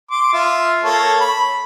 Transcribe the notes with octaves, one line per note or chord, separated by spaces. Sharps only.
C6 D6
F4 E5
A#3 A4 C#5
B5